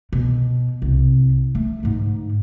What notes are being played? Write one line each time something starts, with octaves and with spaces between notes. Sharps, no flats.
B2
C2
A3
G#2 D3